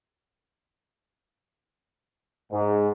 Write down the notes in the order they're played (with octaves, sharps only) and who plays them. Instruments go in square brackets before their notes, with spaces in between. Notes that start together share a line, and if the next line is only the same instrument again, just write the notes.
[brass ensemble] G#2